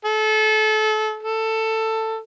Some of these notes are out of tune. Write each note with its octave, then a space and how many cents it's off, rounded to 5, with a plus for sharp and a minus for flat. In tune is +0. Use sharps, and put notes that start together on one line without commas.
A4 -30
A4 +15